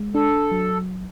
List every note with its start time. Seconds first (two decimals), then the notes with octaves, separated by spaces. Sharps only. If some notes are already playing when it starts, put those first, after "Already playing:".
Already playing: G#3
0.14 D4 A4
0.52 F#3